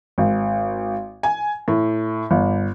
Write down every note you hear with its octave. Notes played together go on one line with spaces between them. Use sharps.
G#1
G#5
A2
G1